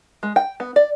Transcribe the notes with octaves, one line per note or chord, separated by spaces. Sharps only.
G#3
G5
B3
D5